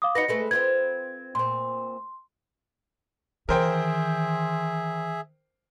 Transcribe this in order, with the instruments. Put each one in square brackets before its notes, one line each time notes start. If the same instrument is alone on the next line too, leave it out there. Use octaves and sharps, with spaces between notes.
[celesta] F5 D6 D#6
[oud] D#4 F#4 B4 [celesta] A#6 C#7
[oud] G#3 A3 B4
[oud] C4 F4 B4 [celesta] G#6
[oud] A#2 C4 [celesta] C6
[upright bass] D#3 E3 [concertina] G#4 E5 [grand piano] A#4 C5 G5